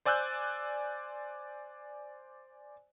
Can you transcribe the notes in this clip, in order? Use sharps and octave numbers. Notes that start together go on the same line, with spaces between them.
C5 D5 G#5 E6 F#6 G6